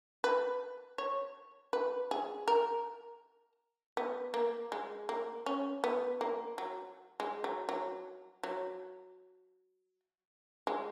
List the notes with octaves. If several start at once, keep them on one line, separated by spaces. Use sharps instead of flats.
B4
C#5
B4
G#4
A#4
B3
A#3
G#3
A#3
C#4
B3
A#3
F#3
G#3
F#3
F#3
F#3
G#3